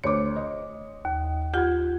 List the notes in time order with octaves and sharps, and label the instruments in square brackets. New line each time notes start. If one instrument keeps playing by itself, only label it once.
[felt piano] D2 C5 D6 [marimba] C#5
[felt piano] D#5
[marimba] D#2
[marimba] F4 G4 [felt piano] F#5 G#6